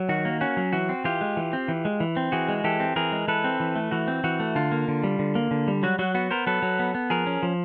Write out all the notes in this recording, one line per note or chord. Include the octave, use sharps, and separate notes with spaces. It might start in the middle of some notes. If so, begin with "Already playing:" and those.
Already playing: F#3
D#3 F#4
A#3
C#4 F#4
F#3
E3 F#4
C4
E3 F4 G4
G#3
E3
C4
E3
G#3
E3
C4
E3 F#4 G#4
G#3
E3 G4 A4
C4
E3 G#4 A#4
G#3
E3 A4 B4
C4
E3
A3
E3 F#4
C4
E3 F#4
A3
D3 F4
A#3
D3
G3
D3
A#3
D3
G3
F#3 F#4
F#3 F#4
B3 F#4
B3 A#4 C5
F#3 A4 B4
F#3
B3
B3
F3 G#4 A#4
C#4
F3